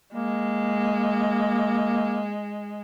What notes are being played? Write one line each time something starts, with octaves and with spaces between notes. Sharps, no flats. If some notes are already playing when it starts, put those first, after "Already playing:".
G#3 A#3